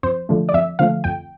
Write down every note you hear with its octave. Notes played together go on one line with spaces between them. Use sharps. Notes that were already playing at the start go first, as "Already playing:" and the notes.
F2 C5
D3 F3 A3
D5
F2 E5
D3 F3 A3 F5
F2 G5